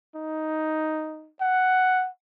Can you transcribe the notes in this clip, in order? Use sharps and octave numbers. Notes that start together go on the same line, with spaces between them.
D#4
F#5